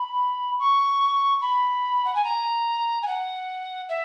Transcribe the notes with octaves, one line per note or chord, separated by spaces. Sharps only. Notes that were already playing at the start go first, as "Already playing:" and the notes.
Already playing: B5
C#6
B5
F#5
G#5
A#5
G#5
F#5
E5